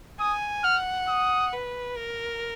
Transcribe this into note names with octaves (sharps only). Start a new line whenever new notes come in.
G#5 D#6
F#5 F6
D#6
B4
A#4